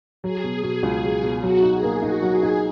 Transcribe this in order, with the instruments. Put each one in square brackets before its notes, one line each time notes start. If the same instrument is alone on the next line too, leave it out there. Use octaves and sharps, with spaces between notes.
[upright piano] F#3 [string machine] G#4
[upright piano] B2
B2
C#2
F#3
B2
[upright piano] F#3 [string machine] F#4
[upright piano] D#4
[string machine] G#4
[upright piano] A#3
[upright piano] D#4 [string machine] F#4
[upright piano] F#3
[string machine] G#4
[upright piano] D#4